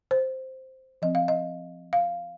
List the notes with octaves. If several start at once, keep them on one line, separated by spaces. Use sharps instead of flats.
C5
F3 C4 D#5
F5
D#5
F5